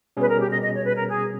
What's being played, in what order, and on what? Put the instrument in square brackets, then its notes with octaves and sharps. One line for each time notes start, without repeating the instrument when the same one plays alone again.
[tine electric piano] B2 G3 C#4 G#4 [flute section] B4
[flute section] A#4
G4
D#5
D#5
C#5
B4
A#4
G#4